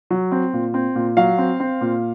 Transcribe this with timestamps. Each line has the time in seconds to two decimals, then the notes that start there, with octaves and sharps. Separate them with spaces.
0.10 F#3
0.32 C4
0.53 A#2
0.74 C4
0.95 A#2
1.17 F#3 F5
1.38 C4
1.60 C4
1.81 A#2